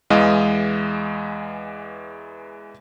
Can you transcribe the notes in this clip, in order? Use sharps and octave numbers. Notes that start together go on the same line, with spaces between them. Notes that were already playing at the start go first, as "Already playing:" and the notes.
E2 E3 G#3 D#5 F5